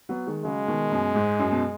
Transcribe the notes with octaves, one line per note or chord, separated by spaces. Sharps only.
F#3 B3
D#3 G#3
C#3 F#3 G#3
B2 D#3
F#2 B2
G#2
F#2
B2